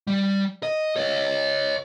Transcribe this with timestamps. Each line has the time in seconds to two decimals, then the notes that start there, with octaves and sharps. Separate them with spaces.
0.07 G3
0.63 D#5
0.96 C#5 D#5